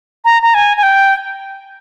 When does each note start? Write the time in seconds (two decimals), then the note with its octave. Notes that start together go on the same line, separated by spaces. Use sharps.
0.25 A#5
0.42 A#5
0.54 G#5
0.77 G#5
0.83 G5